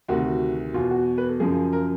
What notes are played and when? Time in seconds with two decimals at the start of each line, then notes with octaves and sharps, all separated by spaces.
0.09 D2 C3 D#3 F#4
0.74 E2 B2 F4
0.91 F#4
1.18 B4
1.29 A4
1.40 F#2 C#3 F3 G#4
1.73 A#4